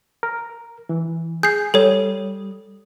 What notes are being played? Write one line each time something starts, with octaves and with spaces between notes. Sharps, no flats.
A#4
E3
G#4 G6 C7
G3 A4 C#5 D#6